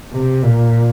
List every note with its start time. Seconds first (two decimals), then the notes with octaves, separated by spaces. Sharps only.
0.12 C3
0.43 A#2